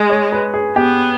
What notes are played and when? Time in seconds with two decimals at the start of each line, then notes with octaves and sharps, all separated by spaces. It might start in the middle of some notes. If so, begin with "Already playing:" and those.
Already playing: G#3
0.10 C#5
0.32 B4
0.54 G#4
0.76 B3 G4